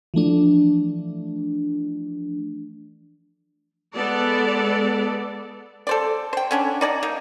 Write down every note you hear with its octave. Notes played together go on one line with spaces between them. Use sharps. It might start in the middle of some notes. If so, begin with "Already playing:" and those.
E3 F3 A3 D4
G#3 B3 A4 D5
A4 C5 D5
C5 G5
D3 C#4 D4
D#4 D5 G#5 A#5
A#3 D#4